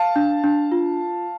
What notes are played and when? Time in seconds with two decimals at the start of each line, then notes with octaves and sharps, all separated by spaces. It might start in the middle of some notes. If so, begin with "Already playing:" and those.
Already playing: F5 A5
0.16 D4
0.44 D4
0.72 F4